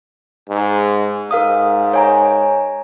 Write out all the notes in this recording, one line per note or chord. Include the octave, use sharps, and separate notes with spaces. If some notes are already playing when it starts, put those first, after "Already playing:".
G#2
G#2 A#4 F5 D#6
C#5 G#5 A#5